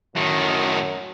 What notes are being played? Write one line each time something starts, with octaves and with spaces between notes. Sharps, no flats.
F#2 A2 D#3